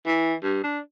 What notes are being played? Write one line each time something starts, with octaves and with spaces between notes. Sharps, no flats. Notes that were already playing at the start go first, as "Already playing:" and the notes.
E3
G2
D4